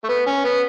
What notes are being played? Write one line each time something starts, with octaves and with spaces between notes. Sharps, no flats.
A3
B3
C#4
B3